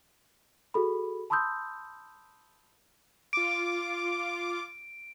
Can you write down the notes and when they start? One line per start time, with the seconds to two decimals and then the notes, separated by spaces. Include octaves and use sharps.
0.74 F#4 G#4 A4 B5
1.30 A5 B5 C6 D#6 E6 G6
3.33 F4 D6 D7